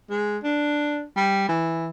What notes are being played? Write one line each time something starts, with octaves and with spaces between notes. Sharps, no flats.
G#3
D4
G3
E3